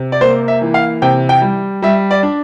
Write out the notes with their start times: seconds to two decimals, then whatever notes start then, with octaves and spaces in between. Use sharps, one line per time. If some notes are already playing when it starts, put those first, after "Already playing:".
Already playing: C3
0.12 D5
0.21 A#3 C5
0.48 E5
0.62 E3
0.74 F5
1.02 C3 G5
1.29 G5
1.42 G3
1.82 G3 E5
2.11 D5
2.23 D4